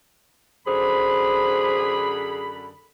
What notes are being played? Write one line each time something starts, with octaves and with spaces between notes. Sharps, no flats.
F#2 D3 G#4 C5 B5